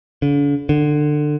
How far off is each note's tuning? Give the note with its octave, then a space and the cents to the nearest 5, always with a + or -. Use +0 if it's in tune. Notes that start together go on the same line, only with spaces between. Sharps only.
D3 -45
D3 +20